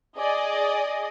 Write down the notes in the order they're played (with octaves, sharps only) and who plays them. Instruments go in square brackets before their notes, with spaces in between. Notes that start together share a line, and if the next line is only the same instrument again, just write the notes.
[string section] G#4 D5 D#5